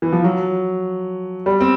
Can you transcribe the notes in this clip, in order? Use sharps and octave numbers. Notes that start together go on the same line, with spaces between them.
E3
F3
F#3
G3
C4